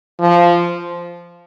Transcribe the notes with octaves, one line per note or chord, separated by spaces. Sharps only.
F3